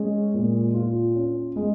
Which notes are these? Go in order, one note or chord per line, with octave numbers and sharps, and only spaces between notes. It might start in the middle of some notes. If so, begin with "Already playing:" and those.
Already playing: G#3 C#4
A#2
F4
C#4
G#3